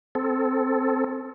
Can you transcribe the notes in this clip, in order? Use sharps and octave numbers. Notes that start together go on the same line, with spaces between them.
C4 A4